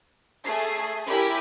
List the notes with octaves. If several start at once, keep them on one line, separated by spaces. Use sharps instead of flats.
A3 G#4 C7
E4 G4 A#4 G#5 B5